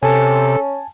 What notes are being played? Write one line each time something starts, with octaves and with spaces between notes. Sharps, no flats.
C3 C#4 A4 G#5 A5